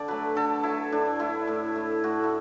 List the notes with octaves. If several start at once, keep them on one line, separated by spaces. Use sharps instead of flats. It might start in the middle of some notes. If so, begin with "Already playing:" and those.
Already playing: D3 D5
F#3 A3 B4
D3 A4
F#3 A3 E4
A2 D4
A3 E4
A2
A3
A2 F#4
E4